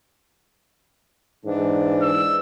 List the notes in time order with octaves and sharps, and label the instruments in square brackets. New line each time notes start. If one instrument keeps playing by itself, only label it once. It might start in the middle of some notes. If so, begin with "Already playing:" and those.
[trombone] G#2 [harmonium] E3 D4
[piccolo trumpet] E6